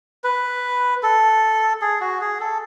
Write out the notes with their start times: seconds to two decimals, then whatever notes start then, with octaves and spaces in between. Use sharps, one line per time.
0.24 B4
1.03 A4
1.81 G#4
2.01 F#4
2.21 G#4
2.40 A4